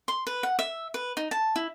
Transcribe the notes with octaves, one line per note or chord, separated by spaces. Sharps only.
C6
B4
F#5
E5
B4
D#4
A5
E4